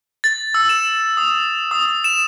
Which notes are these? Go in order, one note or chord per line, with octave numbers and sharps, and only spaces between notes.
A6
E6
E7
D#6
D#6
E7